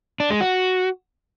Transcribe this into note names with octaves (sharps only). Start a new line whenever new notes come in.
D4
G#3
F#4